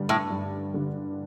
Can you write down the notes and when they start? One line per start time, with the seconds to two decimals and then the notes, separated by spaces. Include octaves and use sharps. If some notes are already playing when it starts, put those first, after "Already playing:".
Already playing: G2 D3 G3
0.09 A2
0.30 G2
0.74 D3 G3